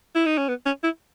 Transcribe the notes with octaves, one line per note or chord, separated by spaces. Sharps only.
E4
D#4
C#4
B3
C#4
E4